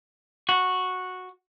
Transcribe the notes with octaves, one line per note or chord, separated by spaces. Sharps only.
F#4